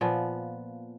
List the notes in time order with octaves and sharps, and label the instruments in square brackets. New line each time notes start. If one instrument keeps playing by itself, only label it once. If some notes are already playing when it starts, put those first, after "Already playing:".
[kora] A#2 F3 B3